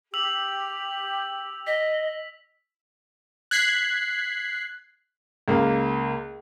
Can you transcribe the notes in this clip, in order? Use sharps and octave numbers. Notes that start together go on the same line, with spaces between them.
G4 E6 F7 F#7
D#5 B6
F#6 G#6 B6 C7
C#2 A#3